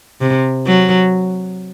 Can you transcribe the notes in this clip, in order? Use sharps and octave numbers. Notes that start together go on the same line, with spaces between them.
C3
F#3